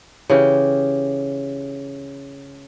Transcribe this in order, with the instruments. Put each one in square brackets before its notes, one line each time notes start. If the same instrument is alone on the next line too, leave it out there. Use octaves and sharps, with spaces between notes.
[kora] C#3 E3 G4